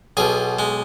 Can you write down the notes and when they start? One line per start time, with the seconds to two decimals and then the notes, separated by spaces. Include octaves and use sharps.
0.17 B1 B2 G#4
0.59 G#3